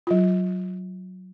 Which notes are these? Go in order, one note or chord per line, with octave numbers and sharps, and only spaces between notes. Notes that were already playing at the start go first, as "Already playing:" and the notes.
F#3 F4